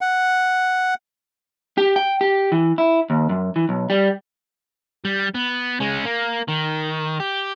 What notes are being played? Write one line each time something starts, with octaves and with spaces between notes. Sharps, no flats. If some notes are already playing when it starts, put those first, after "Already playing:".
F#5
G4
G5
G4
E3
E4
D#2
F#2
E3
B1
G3
G3
B3
G#3 C#4
A#3
D#3
G4